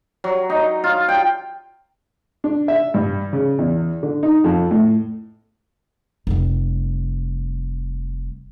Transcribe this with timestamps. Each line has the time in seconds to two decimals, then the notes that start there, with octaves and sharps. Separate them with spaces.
0.24 F#3
0.50 D#4
0.84 F4
1.09 G5
2.44 D4
2.68 E5
2.94 G2
3.33 C#3
3.59 E2
4.03 D3
4.23 D#4
4.44 F2
4.71 A2
6.27 F1 G3